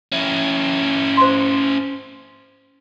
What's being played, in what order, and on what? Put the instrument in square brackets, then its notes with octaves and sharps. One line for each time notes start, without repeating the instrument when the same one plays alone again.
[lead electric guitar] C#4 E4
[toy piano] C5 C6